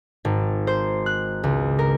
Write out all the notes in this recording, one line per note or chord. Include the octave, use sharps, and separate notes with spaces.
G#1
C5
F#6
C#2
A#4